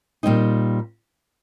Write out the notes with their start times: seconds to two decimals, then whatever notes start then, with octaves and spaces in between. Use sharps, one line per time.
0.23 A#2 G3 C4 D#4